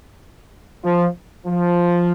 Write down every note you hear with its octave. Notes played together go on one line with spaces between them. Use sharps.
F3
F3